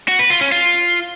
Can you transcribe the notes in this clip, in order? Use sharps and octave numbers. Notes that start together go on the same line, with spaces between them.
F#4
B4
F4
C#4
F4